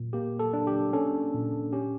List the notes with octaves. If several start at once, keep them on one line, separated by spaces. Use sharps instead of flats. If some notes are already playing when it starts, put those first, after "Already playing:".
Already playing: A#2
A#3 G4
A4
D4
G4
C#4 A4
A#2
C#4 G4